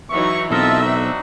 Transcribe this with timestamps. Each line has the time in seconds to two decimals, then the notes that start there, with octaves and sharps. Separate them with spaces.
0.11 E3 F#3 D#4 E5 C#6
0.51 B1 C4 F4 A4 A#4 D#5 E5 A5
0.82 D4 D#4 F#4